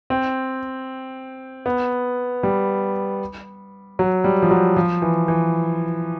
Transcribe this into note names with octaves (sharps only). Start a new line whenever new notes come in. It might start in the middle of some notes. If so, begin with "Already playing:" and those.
C4
B3
G3
F#3
G3
F3
F#3
F3
E3
E3